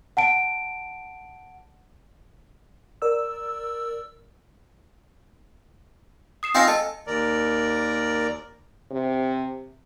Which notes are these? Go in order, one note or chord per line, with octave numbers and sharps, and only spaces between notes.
F#5 A5 D7
A#4 D5 E6
D#6 C7 E7
C4 D#4 F4 G5 G#5 A#6
A4 D#5 A5
D#2 A#4 D5
C3